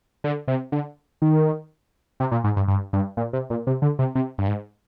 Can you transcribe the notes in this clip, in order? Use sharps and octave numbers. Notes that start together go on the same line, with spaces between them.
D3
C3
D3
D#3
C3
A#2
G#2
G2
G2
G2
A#2
C3
A#2
C3
D3
C3
C3
G2
G#2